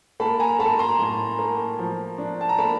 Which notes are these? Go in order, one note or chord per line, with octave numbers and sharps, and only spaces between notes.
A#3 A5 B5
G#5 A#5
A#3 A5 B5
A#5 C6
A2
A#3
F3
D4
A5
A#5
A#3 A5 B5